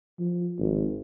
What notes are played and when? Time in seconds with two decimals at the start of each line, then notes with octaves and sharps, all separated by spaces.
0.20 F3
0.59 G#1